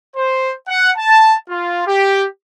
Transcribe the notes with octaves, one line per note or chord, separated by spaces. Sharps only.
C5
F#5
A5
F4
G4